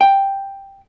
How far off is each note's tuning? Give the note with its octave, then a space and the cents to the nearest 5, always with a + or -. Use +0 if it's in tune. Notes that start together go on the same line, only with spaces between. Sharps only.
G5 +5